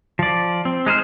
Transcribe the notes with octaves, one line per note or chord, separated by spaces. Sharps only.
F3 D5
C4
G#3 D#4 C5 F6